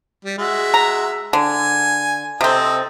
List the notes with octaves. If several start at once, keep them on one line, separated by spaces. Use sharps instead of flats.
G3
G#3 F#4 E5
A#5
D3 G#5
C3 C4 A4 D#5